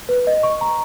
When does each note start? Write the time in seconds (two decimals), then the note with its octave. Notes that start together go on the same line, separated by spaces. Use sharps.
0.09 B4
0.27 D#5
0.43 C#6
0.61 A#5